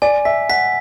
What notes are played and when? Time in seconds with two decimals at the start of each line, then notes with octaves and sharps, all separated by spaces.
0.02 D5 G#5
0.25 E5 B6
0.49 F#5 B6